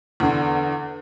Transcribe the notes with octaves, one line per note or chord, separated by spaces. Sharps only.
E2 D3